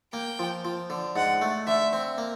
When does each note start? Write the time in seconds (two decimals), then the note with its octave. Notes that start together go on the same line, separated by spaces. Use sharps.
0.13 A#3 G5
0.39 F3
0.65 F3
0.90 D3
1.16 G#2 F#5
1.41 A3
1.67 D3 E5
1.93 C4
2.18 A#3